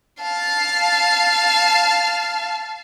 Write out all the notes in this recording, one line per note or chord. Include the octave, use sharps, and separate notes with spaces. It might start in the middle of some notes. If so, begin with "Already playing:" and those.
F5 A5